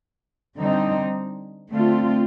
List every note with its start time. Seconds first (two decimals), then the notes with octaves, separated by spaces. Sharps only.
0.57 D3 G3 C4 D#4
1.71 D3 A3 C4 F4